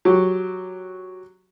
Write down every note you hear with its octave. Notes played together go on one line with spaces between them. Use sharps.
F#3 F#4 G4